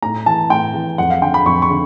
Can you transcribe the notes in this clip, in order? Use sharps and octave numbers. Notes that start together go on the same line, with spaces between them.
A2 A#5
E3 A5
A2 G5
E3
F2 F#5
F5
D3 G5
B5
F2 C#6
C#6
D3